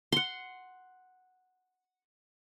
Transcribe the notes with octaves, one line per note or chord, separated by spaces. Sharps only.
F#5 C6